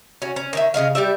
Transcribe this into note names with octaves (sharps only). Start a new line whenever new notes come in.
C#4 F#4
C#4
D#3 C#5 E5
C#3 G#3 D#5 F5
G3 G4 D5 E5